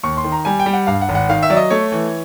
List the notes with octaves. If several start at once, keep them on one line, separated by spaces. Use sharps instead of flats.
D#2 C#6
C6
D#3
A#5
G3 G#5
G5
G3
F#5
G2 F5
F#5
G#1
F#5
D#3 F5
E5
F#3 D5
D#5
A3 C#5
E3